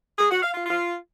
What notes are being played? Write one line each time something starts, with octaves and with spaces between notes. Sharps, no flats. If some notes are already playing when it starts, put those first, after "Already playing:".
G#4
F#4
F5
F4
F4